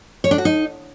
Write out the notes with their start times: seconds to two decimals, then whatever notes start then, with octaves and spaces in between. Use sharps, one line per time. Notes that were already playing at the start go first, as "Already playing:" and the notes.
0.24 C#5
0.31 D4
0.38 F#4
0.45 D#4